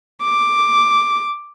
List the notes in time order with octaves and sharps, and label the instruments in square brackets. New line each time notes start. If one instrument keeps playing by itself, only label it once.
[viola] D6